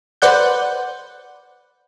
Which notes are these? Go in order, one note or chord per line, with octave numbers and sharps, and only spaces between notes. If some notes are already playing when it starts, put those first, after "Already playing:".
B4 C5 D5 F#5 G6